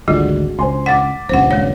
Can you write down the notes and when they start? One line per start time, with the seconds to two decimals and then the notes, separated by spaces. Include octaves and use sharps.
0.08 G#1 D2 D3 G3 G#3 D4 F4 F#4
0.59 C#2 C5 G#5 C6
0.86 F#5 D6 A6 B6
1.29 D#1 C#2 G2 C5 F#5
1.51 G#3 C#5